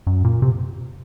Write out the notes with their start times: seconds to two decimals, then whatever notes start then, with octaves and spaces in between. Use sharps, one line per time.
0.07 F#2
0.24 A#2
0.42 C3